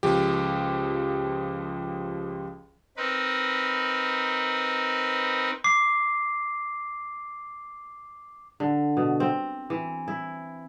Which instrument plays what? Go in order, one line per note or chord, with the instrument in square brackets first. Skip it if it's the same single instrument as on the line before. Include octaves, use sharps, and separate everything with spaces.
[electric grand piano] C#2 F3 G4
[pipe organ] C4 D#4 A#4 B4
[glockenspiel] D6 C7
[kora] D3
B2
C4
E3
E4